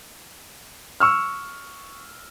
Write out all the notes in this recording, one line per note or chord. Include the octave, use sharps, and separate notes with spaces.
C#6 E6 F6